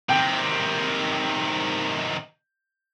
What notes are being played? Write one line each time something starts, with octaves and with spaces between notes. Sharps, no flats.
C3 D#3 G5